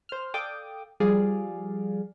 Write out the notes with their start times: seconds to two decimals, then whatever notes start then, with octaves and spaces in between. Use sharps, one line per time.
0.09 C5 F6
0.34 A4 D5 F5 G5 D6 D#6
1.00 F3 G3 G#4 D5 F5